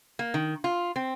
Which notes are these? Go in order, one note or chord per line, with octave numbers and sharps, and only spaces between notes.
A#3
D#3
F4
C4